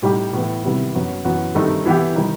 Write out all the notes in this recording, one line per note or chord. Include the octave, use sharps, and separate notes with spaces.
A2 G3 D#4 G4
A2 E3 B3 E4
C3 D#3 G3 B3 E4
F#2 F#3 B3 F#4
F#2 E3 B3 F#4
G2 D#3 A3 C4 D#4
E3 B3 E4 G4
D#3 G3 D#4